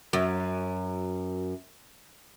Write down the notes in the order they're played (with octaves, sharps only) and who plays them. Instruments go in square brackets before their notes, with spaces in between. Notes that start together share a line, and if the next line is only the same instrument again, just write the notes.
[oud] F#2